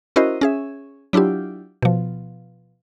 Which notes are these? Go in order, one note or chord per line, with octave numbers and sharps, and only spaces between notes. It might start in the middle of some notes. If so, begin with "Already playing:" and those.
C#4 E4 F#4 A#4 C5 D#5
C#4 G#4 E5
F#3 D4 E4 F4 G4
B2 F3